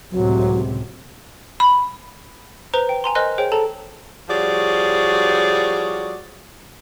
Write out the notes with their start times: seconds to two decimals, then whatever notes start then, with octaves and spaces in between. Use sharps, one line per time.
0.11 C#2 A2 C3 F#3
1.60 B5
2.74 B4 C5 A#5
2.89 G5
3.04 G#5 A#5 C6
3.15 A#4 C5 D#5 G#5 C6 F#6
3.38 G#4 C5 C#5 G5
3.52 A4 A5 A#5
4.29 F3 G3 F#4 G#4 C#5 D5